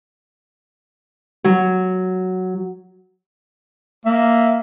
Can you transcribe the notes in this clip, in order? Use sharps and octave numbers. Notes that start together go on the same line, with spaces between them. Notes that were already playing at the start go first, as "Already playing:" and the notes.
F#3
A#3 E5